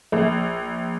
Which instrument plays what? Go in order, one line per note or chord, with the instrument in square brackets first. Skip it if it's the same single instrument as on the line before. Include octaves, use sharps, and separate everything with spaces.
[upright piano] A#1